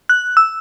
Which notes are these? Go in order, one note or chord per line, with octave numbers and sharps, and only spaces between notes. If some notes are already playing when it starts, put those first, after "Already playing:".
F#6
E6